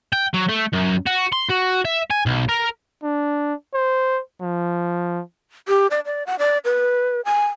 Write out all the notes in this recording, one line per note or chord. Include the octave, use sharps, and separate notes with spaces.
G5
F#3
A3
F#2
F#4
C6
F#4
E5
G#5
B1
A#4
D4
C5
F3
G4
D5
D5
F#5
D5
B4
G#5